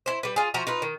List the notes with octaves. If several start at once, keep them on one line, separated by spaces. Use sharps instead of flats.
E4 C5
G3 B4
F4 G#4
F3 F#4 E5 A#5
D#4 F4 B4
D#3